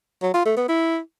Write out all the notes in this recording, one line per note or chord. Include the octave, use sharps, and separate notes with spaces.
F#3
F4
A3
B3
E4